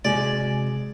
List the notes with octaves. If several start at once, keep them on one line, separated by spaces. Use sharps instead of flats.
C3 G#3 F#4 D5 G#5